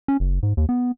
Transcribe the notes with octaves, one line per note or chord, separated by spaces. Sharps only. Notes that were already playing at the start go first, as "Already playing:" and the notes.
C#4
F#1
G#2
D#2
B3